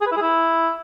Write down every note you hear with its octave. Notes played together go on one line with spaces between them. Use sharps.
G#4
B4
E4
G#4
E4